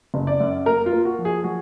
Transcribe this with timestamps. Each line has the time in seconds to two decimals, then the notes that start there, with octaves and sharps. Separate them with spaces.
0.14 F#1
0.27 D5
0.40 F#2
0.66 A#3 A#4
0.86 F4
0.92 A#3
1.05 F#4
1.19 F3
1.25 G#4
1.44 F#3 F#4